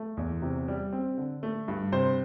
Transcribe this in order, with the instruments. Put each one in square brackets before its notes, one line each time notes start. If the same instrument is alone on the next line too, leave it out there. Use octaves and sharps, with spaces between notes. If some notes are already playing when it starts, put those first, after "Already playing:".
Already playing: [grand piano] A3
E2
C3
G3
C4
D3
A3
G2
C3 C5